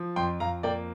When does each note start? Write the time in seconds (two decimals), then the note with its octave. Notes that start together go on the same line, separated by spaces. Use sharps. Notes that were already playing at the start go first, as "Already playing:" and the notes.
Already playing: F3
0.16 F2 G5 C6
0.40 F2 F5 A#5
0.63 A#3 D5 G5